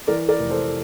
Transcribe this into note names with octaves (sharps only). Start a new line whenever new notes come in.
E3 A#4 D5
A#4 D5
F1
A4 C5